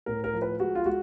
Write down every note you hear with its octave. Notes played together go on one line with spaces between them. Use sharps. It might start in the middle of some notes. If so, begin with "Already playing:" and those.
A2 A#4
A#4
F3
B4
G#3 F#4
F4
G#3 F#4